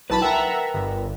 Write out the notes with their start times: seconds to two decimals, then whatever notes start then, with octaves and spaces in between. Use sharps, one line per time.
0.10 B1 E4 B4 A5 B5
0.22 A#4 B4 E5 F#5 G5 A#5
0.74 G1